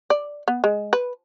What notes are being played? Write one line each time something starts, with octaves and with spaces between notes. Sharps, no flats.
D5
B3
G#3
B4